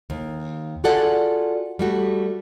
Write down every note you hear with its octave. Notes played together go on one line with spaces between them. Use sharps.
D#2
F4 F#4 G#4 A4 D5 F#5
G3 A3 F#4